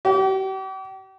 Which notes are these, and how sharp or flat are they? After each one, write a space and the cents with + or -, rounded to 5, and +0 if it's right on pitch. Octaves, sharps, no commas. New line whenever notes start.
G4 -40